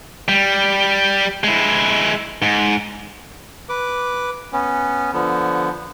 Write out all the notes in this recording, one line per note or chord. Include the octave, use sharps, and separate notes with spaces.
G3
G#3 E4
G#2
B4 D6
B3 C#4
D3 F3 B3